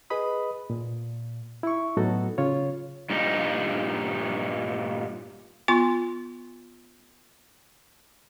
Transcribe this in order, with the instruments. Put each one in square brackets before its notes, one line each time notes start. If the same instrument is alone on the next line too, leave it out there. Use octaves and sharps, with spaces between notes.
[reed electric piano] G#4 B4 D#5 B5 D#6
A#2
E4 C#6
A2 F#3 B3 D#4 F#4 A4
C#3 F4 C#5
[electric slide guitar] G2 A#2 D#4
[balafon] B3 F4 C6 C#6